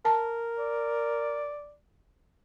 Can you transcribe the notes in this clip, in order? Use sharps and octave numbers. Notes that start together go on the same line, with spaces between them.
A#4 A5
D5